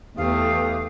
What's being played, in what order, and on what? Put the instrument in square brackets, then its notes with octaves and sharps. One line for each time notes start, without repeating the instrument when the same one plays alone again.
[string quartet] E2 A3 [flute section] G4 B4 D#6 [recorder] F5